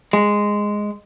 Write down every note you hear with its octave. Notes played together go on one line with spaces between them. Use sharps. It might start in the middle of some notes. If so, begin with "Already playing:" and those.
G#3